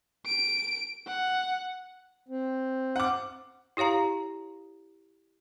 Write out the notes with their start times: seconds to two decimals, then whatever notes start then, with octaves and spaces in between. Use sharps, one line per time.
0.26 D7
1.07 F#5
2.29 C4
2.96 F#5 D6
3.77 E4 G4 C#5 F5 A#5